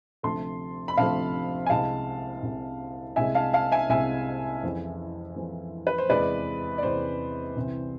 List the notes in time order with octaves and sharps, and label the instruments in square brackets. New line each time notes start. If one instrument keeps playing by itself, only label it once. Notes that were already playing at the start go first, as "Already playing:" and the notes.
[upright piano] D2 C3 F3 A3 A5 C6
B5
D2 C3 F3 A3 F5 A5
G#5
C2 C3 G#3 F5 A5
C2 C3 G#3
C2 C3 G#3 E5 G#5
F5 A5
F5 A5
E5 G#5
C2 C3 G#3 E5 G#5
F2 E3 G#3
F2 E3 G#3
B4
C5
E2 C3 G#3 B4 D5
D5
E2 C3 G#3 C5
C2 C3 E3